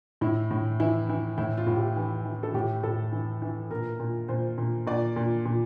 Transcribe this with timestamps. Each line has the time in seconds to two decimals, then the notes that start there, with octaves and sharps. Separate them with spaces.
0.21 A2 E4
0.51 A2
0.80 E3 E4
1.09 E3
1.38 A2 E4
1.57 F4
1.67 A2
1.76 G4
1.96 E3
2.25 E3
2.43 A4
2.54 A2 G4
2.83 A2 A4
3.12 E3
3.42 E3
3.71 A#2 A#4
4.00 A#2
4.28 A#2 C5
4.58 A#2
4.87 A#2 D5
5.16 A#2
5.46 A#2